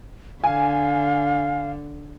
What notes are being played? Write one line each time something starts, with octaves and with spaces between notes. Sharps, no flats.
D3 F5 G#5